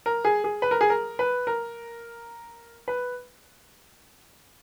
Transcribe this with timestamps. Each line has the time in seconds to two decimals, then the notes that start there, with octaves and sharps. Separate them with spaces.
0.06 A#4
0.25 G#4
0.44 G#4
0.62 B4
0.71 A#4
0.81 G#4
0.90 A#4
1.19 B4
1.47 A#4
2.88 B4